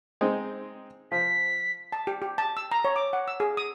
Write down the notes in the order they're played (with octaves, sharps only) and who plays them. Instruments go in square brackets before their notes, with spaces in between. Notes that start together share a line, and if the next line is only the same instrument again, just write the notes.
[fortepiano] G#3 C4 D#4
[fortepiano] F3 [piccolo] B6
[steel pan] A5
G4
G4
A5
E6
A#5
C#5
D6
F#5
E6
G#4
D#6